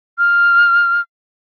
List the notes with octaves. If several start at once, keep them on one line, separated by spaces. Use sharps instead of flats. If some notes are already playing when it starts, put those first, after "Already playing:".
F6